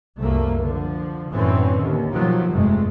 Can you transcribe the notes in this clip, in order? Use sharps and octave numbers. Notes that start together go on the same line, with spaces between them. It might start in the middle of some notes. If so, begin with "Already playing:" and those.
C2 F#2 A3 A#3
D3 F3
F#2 A2 D3 E3 C4 C#4
D#2 D3
B2 D#3 F3 F#3
F1 G2 C3 G#3 A3